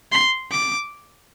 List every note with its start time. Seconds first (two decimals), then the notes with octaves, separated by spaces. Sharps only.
0.12 C6
0.51 D6